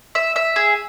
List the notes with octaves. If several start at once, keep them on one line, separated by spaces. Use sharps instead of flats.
E5
E5
G#4